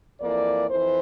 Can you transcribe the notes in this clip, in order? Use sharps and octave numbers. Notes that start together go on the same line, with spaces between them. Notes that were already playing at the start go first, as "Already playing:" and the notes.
F2 E3 A#3 D5
F2 E3 C5